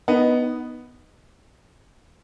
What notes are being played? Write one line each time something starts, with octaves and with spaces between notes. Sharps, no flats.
B3 D#4